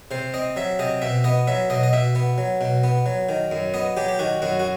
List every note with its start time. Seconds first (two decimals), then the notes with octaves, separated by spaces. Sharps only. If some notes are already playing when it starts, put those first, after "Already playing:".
0.11 C3 C5
0.34 C4 D#5
0.56 F#3 E5
0.79 C3 D#5
1.02 B2 E5
1.24 B3 D#5
1.47 F#3 E5
1.70 B2 D#5
1.83 D#5
1.93 B2 E5
2.15 B3
2.38 F#3
2.61 B2
2.83 B3
3.06 F#3
3.29 D#3
3.51 F#2
3.74 B3 D#5
3.97 F#3 G4
4.08 G4
4.19 D#3 F#4
4.42 F#2 F#4
4.59 F#4